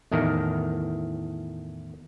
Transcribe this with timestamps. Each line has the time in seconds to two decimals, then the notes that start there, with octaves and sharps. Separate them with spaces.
0.12 E2 A2 D#3 A#4